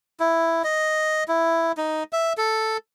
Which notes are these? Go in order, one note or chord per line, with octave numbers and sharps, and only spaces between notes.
E4
D#5
E4
D#4
E5
A4